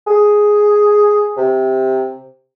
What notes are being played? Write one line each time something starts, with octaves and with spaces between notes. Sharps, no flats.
G#4
C3